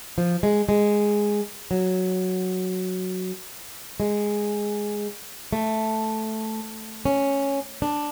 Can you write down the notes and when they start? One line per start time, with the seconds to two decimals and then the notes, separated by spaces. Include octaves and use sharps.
0.18 F3
0.43 G#3
0.69 G#3
1.71 F#3
4.00 G#3
5.53 A3
7.05 C#4
7.82 D4